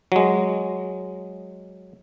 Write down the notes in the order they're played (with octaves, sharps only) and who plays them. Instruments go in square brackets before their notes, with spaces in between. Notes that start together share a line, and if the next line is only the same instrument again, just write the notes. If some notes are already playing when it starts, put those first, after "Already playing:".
[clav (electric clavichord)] F#3 G#3